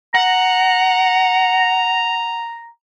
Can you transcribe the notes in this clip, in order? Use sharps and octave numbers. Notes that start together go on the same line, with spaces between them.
F#5 A#5